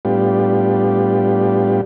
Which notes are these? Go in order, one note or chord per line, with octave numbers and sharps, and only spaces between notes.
A2 G3 B3 D4 F4 G4